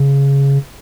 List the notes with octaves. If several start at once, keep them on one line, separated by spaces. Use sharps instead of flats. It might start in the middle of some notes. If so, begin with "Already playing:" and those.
Already playing: C#3